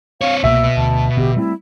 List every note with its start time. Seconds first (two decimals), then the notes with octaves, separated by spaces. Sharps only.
0.21 C4 C#5 F5
0.44 C2 B2 G#3 A#3 E5 E6
0.77 D2 A5
1.17 A1 D3 B3 G4
1.36 G3 A3 C4 E4